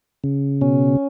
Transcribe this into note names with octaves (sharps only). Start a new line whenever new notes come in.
C#3
B2 C#4